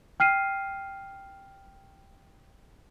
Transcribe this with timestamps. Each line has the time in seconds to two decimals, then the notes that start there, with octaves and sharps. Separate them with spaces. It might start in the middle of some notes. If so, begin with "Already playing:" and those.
0.20 G5 F6 C7 D#7